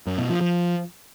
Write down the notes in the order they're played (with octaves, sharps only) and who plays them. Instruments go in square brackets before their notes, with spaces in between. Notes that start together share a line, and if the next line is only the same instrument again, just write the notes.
[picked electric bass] F#2
B2
F3
F3